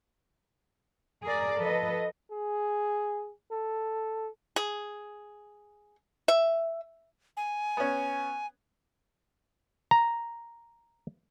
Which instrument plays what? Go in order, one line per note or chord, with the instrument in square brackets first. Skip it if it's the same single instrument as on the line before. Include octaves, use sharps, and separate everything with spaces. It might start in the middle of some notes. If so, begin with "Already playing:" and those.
[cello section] G#4 A#4 D5
F3 A4 B4 D#5
[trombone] G#4
A4
[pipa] G#4
E5
[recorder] G#5
[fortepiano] B3 C#4
[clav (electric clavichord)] A#5